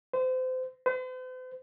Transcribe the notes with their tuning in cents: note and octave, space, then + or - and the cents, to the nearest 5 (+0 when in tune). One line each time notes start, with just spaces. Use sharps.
C5 -30
C5 -45